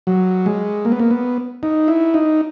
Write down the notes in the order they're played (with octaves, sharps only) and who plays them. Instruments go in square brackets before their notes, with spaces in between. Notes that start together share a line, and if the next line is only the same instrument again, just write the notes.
[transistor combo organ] F#3
G#3
A#3
B3
A#3
B3
D#4
E4
D#4